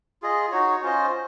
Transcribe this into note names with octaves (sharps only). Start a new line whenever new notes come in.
F4 G#4 D#5
D#4 F#4 C#5
C#4 F4 C5 D#5